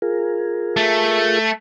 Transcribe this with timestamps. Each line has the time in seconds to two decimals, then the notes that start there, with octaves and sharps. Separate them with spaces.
0.02 F4 G#4 A#4
0.77 A3